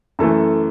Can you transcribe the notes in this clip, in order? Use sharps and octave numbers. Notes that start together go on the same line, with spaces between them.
F#2 E3 A3 A4